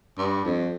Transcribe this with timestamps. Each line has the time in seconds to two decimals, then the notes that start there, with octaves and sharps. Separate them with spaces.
0.18 G2
0.45 F2